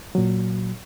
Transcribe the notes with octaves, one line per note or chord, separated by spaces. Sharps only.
A#2 F#3